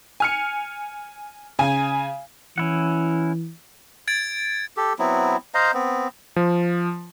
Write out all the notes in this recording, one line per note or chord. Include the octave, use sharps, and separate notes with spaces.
G#5 F6 C#7
C#3 G#5
E3 C#4 E4 F#5
G#6 A6 D7
G4 A4
F#3 B3 C4 E4
C5 D#5 F5 A#5
B3 C4
F3